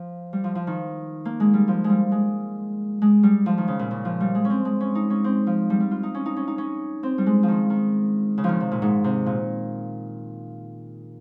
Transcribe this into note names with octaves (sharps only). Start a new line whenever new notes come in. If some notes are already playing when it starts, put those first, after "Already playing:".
Already playing: F3
G3
F3
F3
D#3
A#3
G#3
G3
F3
G#3
G3
G#3
G#3
G3
F3
D#3
C#3
A#2
C#3
F3
G3
G#3
C#4
C4
G#3
C#4
D#4
C#4
C4
F3
G3
G3
F4
D#4
C#4
D#4
C#4
D#4
C#4
C4
G3
G#3
F3
D#3
D#3
C#3
D#3 F3
C3
A#2
G#2
C3
A#2